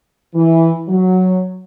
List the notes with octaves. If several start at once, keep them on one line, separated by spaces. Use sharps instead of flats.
E3
F#3